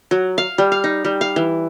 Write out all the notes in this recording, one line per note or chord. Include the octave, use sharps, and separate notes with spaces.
F#3
F5
G3
F5
D#4
G3
F5
E3